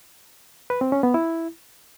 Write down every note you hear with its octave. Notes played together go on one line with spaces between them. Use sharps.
B4
C4
C#4
B3
E4